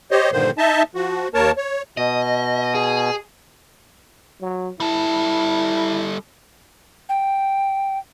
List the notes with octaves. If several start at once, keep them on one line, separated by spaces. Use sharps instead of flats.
G4 C5 C#5 D#5
G2 A#2 D3 D#3 F3 C5
D#4 D#5 E5 A5
F3 F#4
D#2 A#3 A#4 C#5 A5
C#5
B2 D#5
G#4
F#3
G3 E4 A4
G5